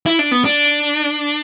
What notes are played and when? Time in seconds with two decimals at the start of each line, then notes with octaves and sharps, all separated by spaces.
0.06 E4
0.19 D4
0.31 B3
0.45 D4